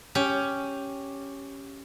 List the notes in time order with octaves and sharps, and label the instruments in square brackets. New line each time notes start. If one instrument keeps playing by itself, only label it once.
[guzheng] C#4 G4